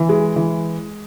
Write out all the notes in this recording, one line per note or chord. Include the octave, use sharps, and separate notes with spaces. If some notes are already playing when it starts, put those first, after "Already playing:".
Already playing: E3
G#3
E3